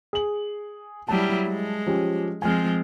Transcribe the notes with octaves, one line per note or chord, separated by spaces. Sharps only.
G#4 F#7
F#3 G3 E4 A5
G#3
F3 C#4 G4
F3 G#3 C4 G#5 F6